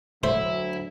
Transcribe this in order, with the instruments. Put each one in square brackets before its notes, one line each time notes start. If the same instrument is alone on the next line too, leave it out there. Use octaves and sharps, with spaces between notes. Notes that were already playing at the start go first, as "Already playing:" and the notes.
[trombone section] D2 F#3 [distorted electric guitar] E4 [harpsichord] C5 [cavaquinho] E5